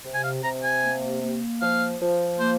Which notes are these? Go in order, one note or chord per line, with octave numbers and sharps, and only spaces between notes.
C3
G#5
F5
C3 A#5
G#5
A#3
A#3
F3 F5
F3
A#3 C5